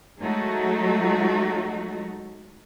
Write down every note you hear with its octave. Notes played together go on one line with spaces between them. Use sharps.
F#3 G#3 A3 D#4 F#4